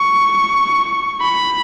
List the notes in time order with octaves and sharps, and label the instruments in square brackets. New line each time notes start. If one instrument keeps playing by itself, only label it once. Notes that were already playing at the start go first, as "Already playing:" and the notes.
Already playing: [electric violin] C#6
B5